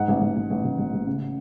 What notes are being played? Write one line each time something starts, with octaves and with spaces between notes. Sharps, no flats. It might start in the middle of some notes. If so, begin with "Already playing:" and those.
Already playing: G#2 F#5
A1
A1
A1
A1
A1
A1
A1
C#3